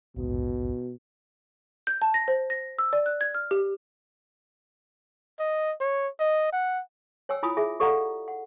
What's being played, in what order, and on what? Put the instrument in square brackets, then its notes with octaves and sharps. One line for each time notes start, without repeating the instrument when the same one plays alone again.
[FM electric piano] A#1 D#2 G#2 [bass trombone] B2
[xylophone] G6
A5
A#6
C5
A#6
E6
D5
F#6
G#6
F6
G4
[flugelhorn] D#5
C#5
D#5
F#5
[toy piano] C#5 G5 G#5 E6
E4 F4 G#5 B5 D#6
G#4 E5 G#5
G4 A4 D5 F5 F#5 A#5
F#5